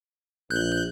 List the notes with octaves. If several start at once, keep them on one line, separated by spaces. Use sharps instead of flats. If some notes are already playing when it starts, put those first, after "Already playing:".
A#1 F#6 G6